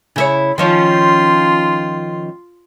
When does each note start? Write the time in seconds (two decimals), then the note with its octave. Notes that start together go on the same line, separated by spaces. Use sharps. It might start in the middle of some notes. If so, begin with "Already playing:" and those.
0.16 C#3 E4 C#5
0.58 D#3 F3 C#4 F4 C6